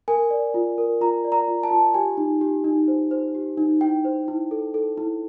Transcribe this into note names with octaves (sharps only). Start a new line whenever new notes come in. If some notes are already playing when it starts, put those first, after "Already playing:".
A#4 G#5
D5
F4
A#4
F4 A#5
D5
A#5
F4
A5
F4
G4 G#5
D#4
G4
D#4
C5
C5
G4
D#4
E4 G5
C5
E4
A4
A4
E4